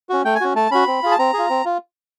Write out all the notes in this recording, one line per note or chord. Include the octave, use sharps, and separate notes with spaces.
C#4 F#4
A3 G5
G#5
C#4 F#4
A3 A5
C#4 F#4 B5
C4
F4 G#4
A5
C4 A#5
F4 G#4
C4
F4